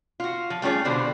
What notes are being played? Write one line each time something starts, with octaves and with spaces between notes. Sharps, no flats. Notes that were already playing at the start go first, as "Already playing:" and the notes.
F4 F#4
F3
G3 A3 C#4 F4 G#4
B2 D3 G3 C5